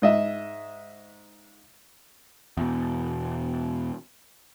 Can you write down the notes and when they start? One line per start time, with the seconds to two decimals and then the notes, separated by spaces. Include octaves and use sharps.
0.02 G#2 D#5 E5
2.57 E2 B2